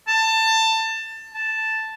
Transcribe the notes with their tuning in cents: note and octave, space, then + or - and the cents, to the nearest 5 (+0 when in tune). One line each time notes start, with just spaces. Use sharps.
A5 +20
A5 +0